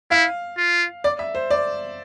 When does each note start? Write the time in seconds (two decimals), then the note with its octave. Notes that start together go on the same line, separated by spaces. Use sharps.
0.11 E4 F5
0.58 F4
1.04 D5
1.19 E5
1.35 C5
1.51 D5